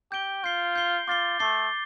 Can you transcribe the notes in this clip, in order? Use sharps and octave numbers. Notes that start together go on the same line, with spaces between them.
G4 G6 D7 G7
F4 G6 C7 G7
G6 C7 G7
F4 D6 A6 C7 G7
A3 D6 A6 C7 G7